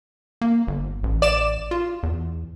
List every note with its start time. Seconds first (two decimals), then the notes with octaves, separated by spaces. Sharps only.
0.41 A#3
0.67 G1
1.03 A1
1.22 D5 E7
1.71 F4
2.03 E2